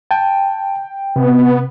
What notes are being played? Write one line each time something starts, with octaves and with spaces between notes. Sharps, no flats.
G5 A5
C3 B3